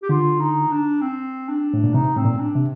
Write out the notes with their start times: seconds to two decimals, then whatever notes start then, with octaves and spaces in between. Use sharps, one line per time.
0.03 G4
0.09 D3 F4
0.40 D#4
0.71 D4
1.02 C4
1.48 D4
1.74 A2
1.84 A#2
1.94 C3 D#4
2.17 A2 C4
2.25 A#2
2.40 D4
2.55 C3